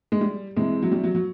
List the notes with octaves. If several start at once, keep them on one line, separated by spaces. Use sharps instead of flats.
G#3
G3
C3 E3 G#3
F#3
G3
F#3
F#3